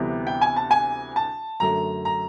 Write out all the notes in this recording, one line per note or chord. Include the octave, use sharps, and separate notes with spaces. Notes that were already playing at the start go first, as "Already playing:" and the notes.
Already playing: D2 C3 E3 G3 B3
G5
G#5
A5
G#5
A5
F#2 D3 F#3 A3 A#5
A#5